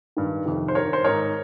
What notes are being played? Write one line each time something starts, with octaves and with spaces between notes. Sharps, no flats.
G2 D#3
F2 C3 D#3
C5
G2 D#3 A#4 C#5
C5
G#2 D#3 A#4 C#5